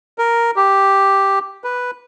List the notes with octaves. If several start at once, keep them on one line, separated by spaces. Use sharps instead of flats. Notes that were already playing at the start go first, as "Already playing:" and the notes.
A#4
G4
B4